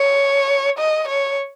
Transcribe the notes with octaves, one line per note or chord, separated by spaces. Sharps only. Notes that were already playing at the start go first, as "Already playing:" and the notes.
Already playing: C#5
D#5
C#5